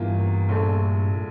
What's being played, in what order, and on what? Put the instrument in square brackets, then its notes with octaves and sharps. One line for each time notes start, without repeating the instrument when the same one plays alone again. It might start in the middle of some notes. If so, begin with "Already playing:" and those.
Already playing: [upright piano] E2 E3 A#3 F4 [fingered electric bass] G2
[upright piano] A#1 A#2 A3
[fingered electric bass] A#2